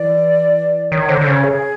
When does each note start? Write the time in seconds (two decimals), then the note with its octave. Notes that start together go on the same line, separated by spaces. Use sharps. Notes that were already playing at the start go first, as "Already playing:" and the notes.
Already playing: E3 D5
0.91 D#3 C#5
1.09 D3 C5
1.21 D3
1.26 C#3 C#5
1.44 G#4